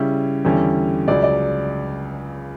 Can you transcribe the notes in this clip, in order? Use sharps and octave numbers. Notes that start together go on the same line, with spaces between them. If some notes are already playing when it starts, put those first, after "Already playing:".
Already playing: C#3 G3 C#4 E4
E2 D3 G3 C#4 E4
C#2 C#3 F#3 D5
D5